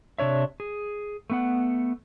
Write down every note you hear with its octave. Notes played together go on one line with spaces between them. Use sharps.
C3 D4 C#5 E5
G#4
A3 B3 F#5